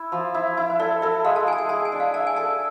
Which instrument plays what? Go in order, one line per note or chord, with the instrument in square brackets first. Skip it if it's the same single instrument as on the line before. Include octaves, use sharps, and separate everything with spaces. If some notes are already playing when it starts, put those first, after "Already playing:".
Already playing: [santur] E4
F3
E4
E4
[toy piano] C5
[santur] A4 [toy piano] D5
[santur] A4 [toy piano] E5
[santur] G#3 [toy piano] F5
[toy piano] A5
[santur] G#4 [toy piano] G#5
[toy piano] A5
G#5
[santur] G#4 [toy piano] A5
[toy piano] G#5
[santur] D4
[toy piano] F5
[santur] E5 [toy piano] A5
[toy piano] G#5
[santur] A4 [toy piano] A5